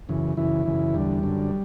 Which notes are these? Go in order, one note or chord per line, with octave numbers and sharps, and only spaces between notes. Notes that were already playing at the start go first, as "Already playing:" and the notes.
F#2 C#3 E3
F#2 C#3 E3 E4
F#2 C#3 E3
E2 D3 G3
F#2 D3